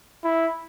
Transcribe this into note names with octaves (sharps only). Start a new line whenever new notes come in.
E4